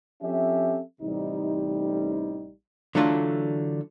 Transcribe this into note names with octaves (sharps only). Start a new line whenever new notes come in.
F3 C4 C#4 G4 A4 E5
A1 C3 G3 D#4
D3 E3 F#3 A3 D4 F4